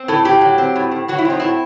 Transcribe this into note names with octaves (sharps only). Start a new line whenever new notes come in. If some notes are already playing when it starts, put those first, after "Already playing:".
Already playing: C4
A2 A4
A2 G4
F#3
C4
A2
A2
F#3 F#4
E4
C4 D#4
A2 E4